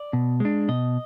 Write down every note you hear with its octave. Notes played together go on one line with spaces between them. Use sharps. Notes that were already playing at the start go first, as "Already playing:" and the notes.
Already playing: D5
B2
G#3 D4
B2 D#5